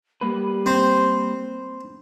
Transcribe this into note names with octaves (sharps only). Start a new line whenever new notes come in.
G3 A#3 B4
C4 C5